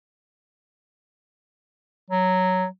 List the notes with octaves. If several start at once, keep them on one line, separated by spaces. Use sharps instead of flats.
F#3